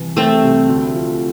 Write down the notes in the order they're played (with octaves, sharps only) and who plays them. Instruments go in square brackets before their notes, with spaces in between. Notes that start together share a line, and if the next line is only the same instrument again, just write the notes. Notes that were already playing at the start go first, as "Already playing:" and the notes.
Already playing: [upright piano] C2 E3
[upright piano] C3 [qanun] A3 C4
[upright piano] C2
D2
F3